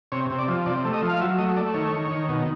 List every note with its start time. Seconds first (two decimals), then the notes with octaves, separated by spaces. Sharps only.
0.12 C3 C#5
0.30 C3
0.39 D5
0.48 F3
0.66 C3 D5
0.85 A3
0.93 D#5
1.02 F3
1.09 F5
1.20 F#3 E5
1.38 A3 D#5
1.56 A3 D5
1.74 D#3 C#5
1.93 D#3
2.11 D#3
2.29 B2